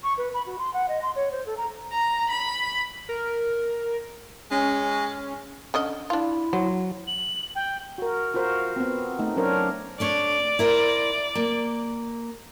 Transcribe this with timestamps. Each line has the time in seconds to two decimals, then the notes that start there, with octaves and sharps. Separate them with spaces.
0.03 C#6
0.18 B4
0.34 B5
0.46 F#4
0.59 C6
0.74 F#5
0.89 D#5
1.02 C6
1.16 C#5
1.32 C5
1.46 A4
1.57 A#5
1.92 A#5
2.30 B5
3.09 A#4
4.51 G#3 C#4
5.74 D3 C#4 D#5
6.10 D4 E4 F4
6.53 F#3 C5
7.07 F#7
7.55 G5
7.98 F#4 A#4
8.34 F4 F#4 A#4 C5
8.76 B3 C4
9.19 A3 D#4
9.37 F#3 C#4 D4 A#4 C5 C#5
10.00 A3 D4 C#5 D5
10.59 E4 A#4 C5
11.35 A#3